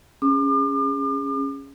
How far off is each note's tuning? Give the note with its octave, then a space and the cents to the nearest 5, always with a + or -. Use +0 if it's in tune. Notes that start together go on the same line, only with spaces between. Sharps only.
C#4 +0 G#4 -15 D6 +40